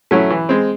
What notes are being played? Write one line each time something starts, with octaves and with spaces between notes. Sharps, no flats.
F#3 A3 C#4 E4
E3
G#3 C4